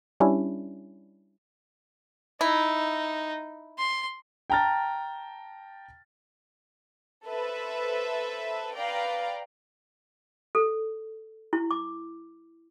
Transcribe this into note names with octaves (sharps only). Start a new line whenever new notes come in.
G3 C#4 D4 E4
D#4 E4
C6
G5 A5 A#5 F6 A6
A4 B4 C5 E5
B4 D5 F5 G5 A#5
A4
E4
D6